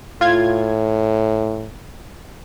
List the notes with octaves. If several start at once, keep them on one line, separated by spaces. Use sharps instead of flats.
A2 F4 G#6